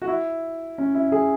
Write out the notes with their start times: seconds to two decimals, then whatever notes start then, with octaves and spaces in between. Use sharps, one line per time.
0.02 F#4
0.08 E4
0.78 C#4
0.94 E4
1.12 G#4